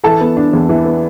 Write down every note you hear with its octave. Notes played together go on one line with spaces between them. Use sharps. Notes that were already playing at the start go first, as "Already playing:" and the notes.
E3 A4 A5
B3
D4
E2
E3
B3